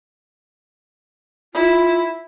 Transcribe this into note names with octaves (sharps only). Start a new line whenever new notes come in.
E4 F4